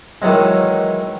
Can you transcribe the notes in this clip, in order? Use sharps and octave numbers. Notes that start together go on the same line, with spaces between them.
D#3 E3 F#3 G#3